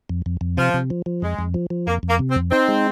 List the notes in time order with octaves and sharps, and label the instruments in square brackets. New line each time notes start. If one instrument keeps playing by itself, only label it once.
[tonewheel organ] F2
F2
F2
[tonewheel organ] C3 [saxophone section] F3
[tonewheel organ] C3
F3
F3
[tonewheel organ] F2 [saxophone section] G#3
[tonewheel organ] F2
F3
F3
[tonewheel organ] F2 [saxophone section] A#3
[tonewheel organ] F2
[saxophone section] A#3
[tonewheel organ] C3
[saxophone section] C4
[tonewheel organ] F2
[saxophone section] C4 [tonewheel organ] D#4
[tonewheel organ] G#3